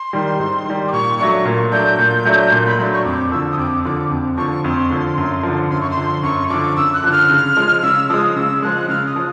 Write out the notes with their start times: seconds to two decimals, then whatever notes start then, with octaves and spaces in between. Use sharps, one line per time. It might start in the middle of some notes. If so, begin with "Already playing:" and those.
Already playing: C6
0.13 D#3 G3
0.39 G#2
0.66 D#3 G3
0.88 D6
0.93 A#2 C#6
1.19 F#3 A3 D4 C#6
1.45 A#2
1.72 F#3 A3 D4 G6
1.99 A#2
2.25 F#3 A3 D4
2.52 A#2
2.66 B5
2.79 F#3 A3 D4 C6
2.92 C#6
3.05 F2 D6
3.31 D3 F3 E6
3.51 D#6
3.58 F2 D6
3.84 D3 F3 D6
4.11 F2
4.38 D3 F3 C#6
4.64 F2 C6
4.90 D3 F3
5.18 F#2
5.43 D3 F3
5.70 F#2 C6
5.81 C#6
5.90 C6
5.97 D3 F3
6.23 F#2 C#6
6.50 D3 F3 D6
6.76 F#2 E6
6.94 F#6
7.04 D3 F3
7.12 F6
7.29 C#3
7.57 F3 G#3
7.83 C#3 E6
8.10 F3 G#3 D#6
8.32 F6
8.35 C#3 E6
8.62 F3 G#3 F#6
8.88 C#3 F6
9.06 D#6
9.16 F3